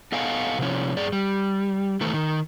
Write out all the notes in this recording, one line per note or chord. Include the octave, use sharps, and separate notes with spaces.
B3 A4 D#5 F5 F#5 G#5
C3 F3 C#4
G2 G#4 D5
G3
D#3 E3 A3 A4
D#3